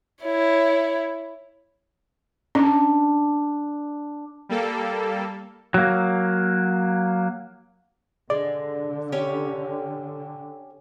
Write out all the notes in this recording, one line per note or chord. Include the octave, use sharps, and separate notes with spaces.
E4 C#5
C#4 D4
G3 A#3 A4
F#3 A#3
D3 G#3 D5
C#4 G4 C#5